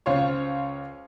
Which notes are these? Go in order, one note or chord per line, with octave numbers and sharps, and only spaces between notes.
C#2 F4 C5 C#5 C#6